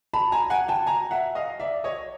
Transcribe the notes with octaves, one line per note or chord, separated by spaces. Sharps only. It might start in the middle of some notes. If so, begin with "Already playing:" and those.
A5 B5
G#5 A#5
F#5 G#5
G5 A5
G#5 A#5
E5 F#5
D#5 F5
D5 E5
C#5 D#5